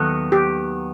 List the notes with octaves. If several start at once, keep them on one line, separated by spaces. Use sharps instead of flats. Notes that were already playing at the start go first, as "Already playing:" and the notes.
Already playing: D#2 D#3 F#3 B3 A4
G4